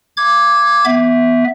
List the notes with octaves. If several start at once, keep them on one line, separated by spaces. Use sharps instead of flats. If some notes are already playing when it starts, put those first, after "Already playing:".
D6 G#6
B3 E5